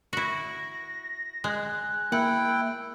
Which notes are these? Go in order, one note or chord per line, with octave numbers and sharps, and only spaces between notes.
E4 F#4 A#6
G#3 F#6
A#3 E4 F#5 G5